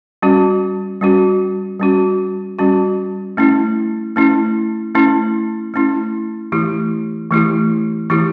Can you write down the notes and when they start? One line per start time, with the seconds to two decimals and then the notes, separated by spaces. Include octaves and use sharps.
0.22 G3 C#4 F#4
1.01 G3 C#4 F#4
1.80 G3 C#4 F#4
2.59 G3 C#4 F#4
3.37 A3 C#4 E4
4.16 A3 C#4 E4
4.95 A3 C#4 E4
5.74 A3 C#4 E4
6.52 E3 A3 E4 G4
7.31 E3 A3 E4 G4
8.10 E3 A3 E4 G4